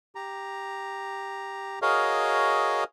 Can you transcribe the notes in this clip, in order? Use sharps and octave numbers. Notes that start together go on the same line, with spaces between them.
G4 A#5
F#4 G#4 A#4 C#5 D#5 F5